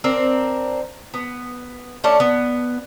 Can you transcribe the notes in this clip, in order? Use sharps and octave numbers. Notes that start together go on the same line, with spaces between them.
C4 D4 A#4
B3
A3 C#4 D4
B3